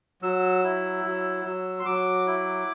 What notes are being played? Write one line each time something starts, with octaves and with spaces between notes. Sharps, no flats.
F#3 E6
E4
F#3
F#3
C6
F#3 D6
E4